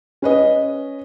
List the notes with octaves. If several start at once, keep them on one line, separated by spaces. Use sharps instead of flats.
C#4 B4 D#5